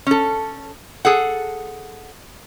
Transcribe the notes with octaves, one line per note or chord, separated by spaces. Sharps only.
C#4 A4
G#4 A4 F#5